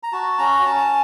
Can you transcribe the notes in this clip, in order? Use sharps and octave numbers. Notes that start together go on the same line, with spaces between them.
A#5
F#4 A5
C#4 A#5
C#4 A5